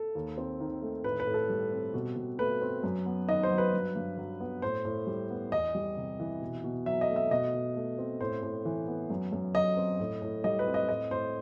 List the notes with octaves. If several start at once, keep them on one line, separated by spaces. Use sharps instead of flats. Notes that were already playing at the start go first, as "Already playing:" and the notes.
Already playing: A4
D#2
C4
D#3
A3
A2 B4
B4
A2
A4
G3
C4
B2
B2
A3 B4
C4
F#2
B3
D#3 D#5
C5
F#3
B4
G2
G2
F#3
B3
A2 C5
A2
G3
B3
E2 D#5
G3
C3
E3
B2
B2
F#3 E5
D#5
A3
E5
B2 D#5
B2
A3
C4
A2 C5
A2
E3
B3
F#2
F#2
F#3 D#5
C4
A2
A2
G3 D#5
B4
C4
D#5
A2 D#5
A2 C5